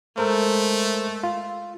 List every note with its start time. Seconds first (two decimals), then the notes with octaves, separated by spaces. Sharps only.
0.18 G#3 A3 A4 A#4 C5
1.23 F4